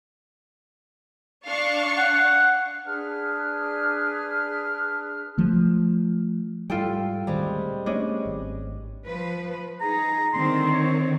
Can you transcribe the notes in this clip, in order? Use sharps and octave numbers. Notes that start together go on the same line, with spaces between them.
D4 F5 C#6
F#5
D4 G#4 B4 F6
F3 A3
G#2 G3 F4 A4 G5
D2 A#2 D#3 G3 G#3 C4
A3 B3 C#4 D4 D#5
G#1
F3 B4
D#4 G#4 A#5
D3 D#3 C4 C6
C#5